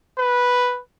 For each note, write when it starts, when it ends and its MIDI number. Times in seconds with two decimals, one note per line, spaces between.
0.19 0.80 71